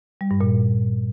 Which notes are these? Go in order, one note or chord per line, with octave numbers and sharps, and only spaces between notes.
G3
G2
A#2